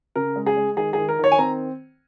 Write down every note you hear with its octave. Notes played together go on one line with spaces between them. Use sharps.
C#3 A#4
G#3
G#4
G#3
D#3 G#4
D#3 G#4
A#4
D#3 C#5
G#5
C4 A#5